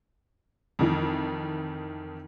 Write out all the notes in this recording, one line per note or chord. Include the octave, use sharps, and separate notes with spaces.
F2 D#3 E3